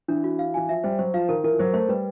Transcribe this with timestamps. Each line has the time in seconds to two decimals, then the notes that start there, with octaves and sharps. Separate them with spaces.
0.08 E3 D4
0.24 F#4
0.39 F5
0.54 E3 G#5
0.69 F3 E5
0.84 G3 C5
0.99 F#3 C5
1.14 F3 F5
1.29 D#3 A#4
1.44 E3 A#4
1.53 F3
1.59 F#3 C5
1.74 A3 C5
1.89 G3 B4